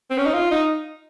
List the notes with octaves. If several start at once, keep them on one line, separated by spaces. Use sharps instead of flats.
C4
C#4
D#4
F4
D#4